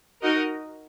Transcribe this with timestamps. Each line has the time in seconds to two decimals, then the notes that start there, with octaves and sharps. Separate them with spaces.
0.23 D#4 F#4 A#4 D#5